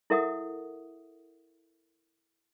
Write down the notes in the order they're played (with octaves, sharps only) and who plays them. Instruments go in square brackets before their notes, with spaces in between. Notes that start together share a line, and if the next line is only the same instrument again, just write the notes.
[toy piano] E4 A4 A#4 E5 F#5 D#6